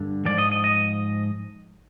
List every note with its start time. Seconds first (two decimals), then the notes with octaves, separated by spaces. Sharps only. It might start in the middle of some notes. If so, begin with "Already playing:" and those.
Already playing: G2 D3
0.25 G#2 F3 D5
0.38 D#5
0.52 D#5
0.64 D#5